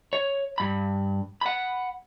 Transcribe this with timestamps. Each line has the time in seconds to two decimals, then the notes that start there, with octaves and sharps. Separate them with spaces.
0.13 C#5
0.58 G2 B5
1.41 F#5 B5